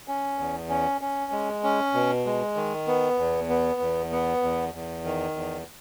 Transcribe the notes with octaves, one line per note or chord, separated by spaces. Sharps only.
C#4
E2
C#4
C#4
G#3
C#4
B2
G#3
D#3
B3
E2
B3
E2
B3
E2
E2
D#3
E2